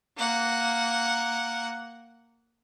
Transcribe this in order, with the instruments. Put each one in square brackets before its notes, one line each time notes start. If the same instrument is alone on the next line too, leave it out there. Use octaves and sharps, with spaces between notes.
[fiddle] A#3 F#5